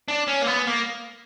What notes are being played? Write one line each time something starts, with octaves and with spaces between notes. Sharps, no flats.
D4
C#4
A#3
B3
A#3